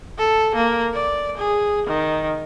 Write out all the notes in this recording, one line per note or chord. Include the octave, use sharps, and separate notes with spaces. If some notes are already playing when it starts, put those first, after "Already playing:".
A4
A#3
D5
G#4
D#3